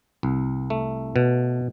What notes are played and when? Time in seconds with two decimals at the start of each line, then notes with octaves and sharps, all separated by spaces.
0.23 C2
0.70 A3
1.16 B2